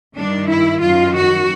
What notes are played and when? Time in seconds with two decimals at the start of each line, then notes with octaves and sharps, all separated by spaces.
0.16 G2 D#3 D4
0.48 E4
0.81 F#2 D#3 F4
1.14 F#4